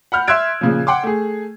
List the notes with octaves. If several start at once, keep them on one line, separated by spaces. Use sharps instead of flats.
F#5 B5 F6 G6
E5 C6 E6 F#6 G#6 D7
A#2 C#3 F3
F#5 G5 C6 D6
A3 G#4